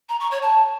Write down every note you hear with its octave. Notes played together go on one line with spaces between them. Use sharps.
A#5
C#6
C#5
A5